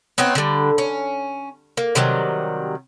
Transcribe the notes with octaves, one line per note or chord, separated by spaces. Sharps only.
B3 C4 D#4 C#5
D3 G3
C#4
A#3
C3 D#3 F#3 G3